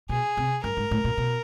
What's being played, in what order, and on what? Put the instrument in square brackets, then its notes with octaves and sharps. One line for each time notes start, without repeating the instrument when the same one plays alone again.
[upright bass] B2 [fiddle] G#4
[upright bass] C3
[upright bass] G2 [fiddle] A#4
[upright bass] G#2
A2
A#2
B2